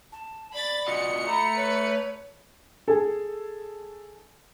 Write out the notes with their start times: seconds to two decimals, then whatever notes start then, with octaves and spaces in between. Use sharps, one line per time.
0.12 A5
0.53 D5 B5 A6
0.88 F4 F#4 D#5 C#7
1.27 A3 A#5 B5
1.57 B4 C#5
2.88 G#4 A4